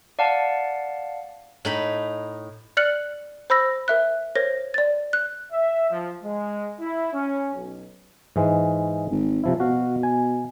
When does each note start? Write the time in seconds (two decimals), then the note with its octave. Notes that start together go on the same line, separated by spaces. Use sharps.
0.19 D5 F5 F#5 A5
1.65 A2 D#4 B5
2.77 D5 F6 F#6 C#7 F#7
3.50 C5 B5 E6 A#6
3.88 A#4 E5 F#6
4.35 A#4 C5 C#5 A#6
4.74 D5 A6
5.13 F#6
5.53 E5
5.91 F3
6.22 G#3
6.80 E4
7.13 C#4
7.55 B1
8.36 G#2 E3 G#3
9.11 G#1
9.44 C3 F3 E4
9.60 B2 F#4 F5
10.03 G#5